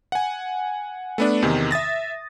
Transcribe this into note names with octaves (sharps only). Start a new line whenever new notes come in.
F#5 G#5
A3 B3 D4
E2 C3 D#3
E5 D#6 A6 A#6